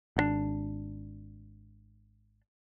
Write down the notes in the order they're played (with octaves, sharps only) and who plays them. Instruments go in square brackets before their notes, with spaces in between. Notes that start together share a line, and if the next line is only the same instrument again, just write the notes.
[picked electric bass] G#1 D#3 D4